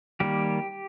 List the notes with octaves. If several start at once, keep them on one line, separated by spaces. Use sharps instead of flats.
D#3 G3 A#3 G4